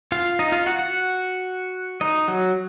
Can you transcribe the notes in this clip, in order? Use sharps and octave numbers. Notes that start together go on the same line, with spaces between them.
F4 F5
D#4 D#5
F4 F5
F#4 F#5
F#4 F#5
D#4 D#5
F#3 F#4